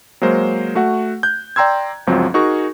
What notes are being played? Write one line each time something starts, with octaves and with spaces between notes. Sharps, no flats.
F#3 G#3 A#3 A#4 C5
A3 F#4 F#5
F#6 G6
D5 G5 A#5 C6 E6 G#6
G1 C#2 F3 F#3 C4
D#4 F#4 G#4 A#4 C#6